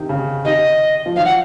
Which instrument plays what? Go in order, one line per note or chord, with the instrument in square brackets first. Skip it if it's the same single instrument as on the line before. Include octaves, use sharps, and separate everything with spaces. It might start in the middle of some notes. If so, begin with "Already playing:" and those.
Already playing: [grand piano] C3 D#3
C#3
[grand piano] C3 D#3 [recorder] D#5
[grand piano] F3
[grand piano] D#3 F#3 [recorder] F5
[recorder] F#5